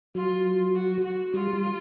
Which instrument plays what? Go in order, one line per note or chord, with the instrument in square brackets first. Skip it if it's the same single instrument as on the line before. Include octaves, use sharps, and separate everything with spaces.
[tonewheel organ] F#3 [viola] F4
[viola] F#4
F#4
[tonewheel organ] G3 [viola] F4
[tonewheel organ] G3